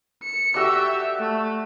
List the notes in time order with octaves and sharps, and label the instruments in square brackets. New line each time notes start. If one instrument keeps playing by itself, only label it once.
[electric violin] C#7
[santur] F#4 A4 D5 [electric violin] G4 E5
[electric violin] A3